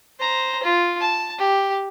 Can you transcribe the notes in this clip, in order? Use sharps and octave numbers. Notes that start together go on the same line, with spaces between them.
C5 A#5
F4
A5
G4